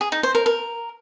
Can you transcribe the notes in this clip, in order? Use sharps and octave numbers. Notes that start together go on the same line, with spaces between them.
G#4
D#4
C5
A#4
A#4